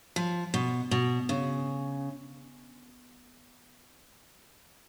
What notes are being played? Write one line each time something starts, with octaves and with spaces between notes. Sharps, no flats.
F3
B2
B2
C#3